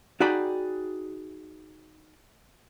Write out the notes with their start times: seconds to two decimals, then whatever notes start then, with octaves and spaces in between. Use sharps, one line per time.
0.20 D#4 F#4 G#4 D5 G5 B5